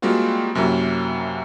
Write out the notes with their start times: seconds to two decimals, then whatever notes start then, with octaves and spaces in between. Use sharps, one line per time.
0.02 G3 G#3 A#3 C4 F4 F#4
0.55 F#2 C3 F#3 A#3 E4